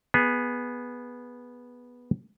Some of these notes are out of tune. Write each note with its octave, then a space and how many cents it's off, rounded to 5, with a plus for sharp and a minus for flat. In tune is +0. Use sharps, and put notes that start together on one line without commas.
B3 -10 G#4 +0